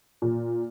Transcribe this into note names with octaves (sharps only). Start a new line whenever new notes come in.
A#2